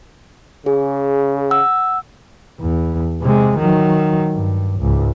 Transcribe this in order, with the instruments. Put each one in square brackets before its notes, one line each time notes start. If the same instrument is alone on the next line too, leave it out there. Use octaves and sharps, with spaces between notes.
[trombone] C#3 [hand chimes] G#4
[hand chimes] F#5 E6
[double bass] E2
C3 G#3
D#3 F#3
G2
C#2 G#2